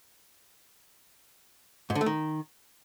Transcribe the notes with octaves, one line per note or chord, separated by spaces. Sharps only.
G#2
D3
A3
D#3